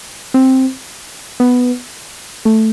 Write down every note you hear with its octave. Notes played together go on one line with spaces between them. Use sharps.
C4
B3
A3